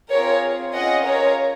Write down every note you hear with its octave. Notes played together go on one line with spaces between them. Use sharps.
C4 F4 G#4 A#4 C#5
C#4 F4 G#4 D#5 F#5
A#4 C#5